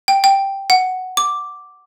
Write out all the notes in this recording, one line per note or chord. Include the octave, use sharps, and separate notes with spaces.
G5
G5
F#5
D6